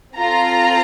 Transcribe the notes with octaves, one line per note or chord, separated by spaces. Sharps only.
C4 F4 A4 A#5